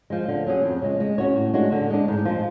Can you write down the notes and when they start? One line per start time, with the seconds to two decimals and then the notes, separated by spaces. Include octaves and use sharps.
0.10 F3 G#3
0.28 D3
0.46 F#3 C#4 G#4
0.64 F2
0.82 C#3 G#3
1.00 G#3
1.18 C#4 F#4 C#5
1.36 A2
1.54 G#3 D4 F#4 C#5
1.72 D3
1.90 G#3 D4
2.08 G#2
2.25 F3 G#3